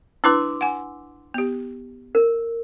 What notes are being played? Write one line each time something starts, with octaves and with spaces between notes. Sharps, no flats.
D4 E4 B4 C6 D6 E6
F#5 G#5
B3 G4
A#4